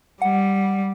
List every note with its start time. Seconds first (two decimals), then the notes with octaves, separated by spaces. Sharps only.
0.22 G3 F#5